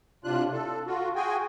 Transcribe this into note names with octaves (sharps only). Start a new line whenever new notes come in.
A2 C3 D4 F4 F#6
A4
F4 F#4
F#4 G#4 G5 G#5